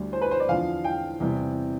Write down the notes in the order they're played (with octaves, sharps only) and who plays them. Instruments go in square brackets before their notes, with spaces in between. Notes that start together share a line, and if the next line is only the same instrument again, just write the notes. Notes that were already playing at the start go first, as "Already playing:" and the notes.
Already playing: [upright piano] D2 D3 G3
C5
B4
C5
D5
E2 D3 F3 F5
G5
E2 C3 G3